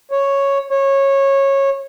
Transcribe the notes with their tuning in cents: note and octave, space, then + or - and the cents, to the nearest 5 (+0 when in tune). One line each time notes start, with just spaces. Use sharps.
C#5 +0
C#5 -15